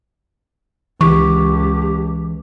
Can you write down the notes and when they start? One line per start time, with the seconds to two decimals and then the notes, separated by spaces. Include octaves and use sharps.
1.01 C#2 E3 G4 C#6